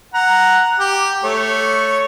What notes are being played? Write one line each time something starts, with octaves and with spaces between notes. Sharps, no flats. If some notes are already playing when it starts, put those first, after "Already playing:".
F#5 A#5
G4
A3 C#5